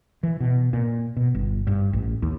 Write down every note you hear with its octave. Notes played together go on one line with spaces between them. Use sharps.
E3
B2
A#2
B2
G1
G2
A1
D#2